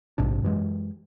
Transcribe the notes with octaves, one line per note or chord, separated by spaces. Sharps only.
A#1 G#2 C3 D4
F#2 E3 G#3